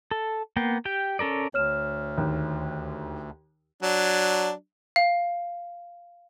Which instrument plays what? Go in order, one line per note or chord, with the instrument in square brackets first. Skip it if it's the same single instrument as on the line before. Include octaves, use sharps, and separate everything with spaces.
[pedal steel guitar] A4
A#3 B3 G5
G4 G5
C#4 A4 A#4 D5
[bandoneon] D2 [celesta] C#5 F6 E7
[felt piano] D#2
[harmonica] F#3 D4
[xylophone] F5